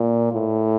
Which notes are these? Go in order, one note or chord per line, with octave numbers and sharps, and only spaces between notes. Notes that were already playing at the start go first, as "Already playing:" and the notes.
Already playing: A#2
A2